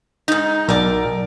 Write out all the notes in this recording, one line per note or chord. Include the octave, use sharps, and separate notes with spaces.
G#2 D#4
B1 A#4 D5